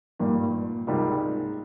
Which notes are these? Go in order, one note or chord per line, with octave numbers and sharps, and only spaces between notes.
G#1 G2 A#2 G3 A#3
C#2 G#2 C3 G3 A#3 F4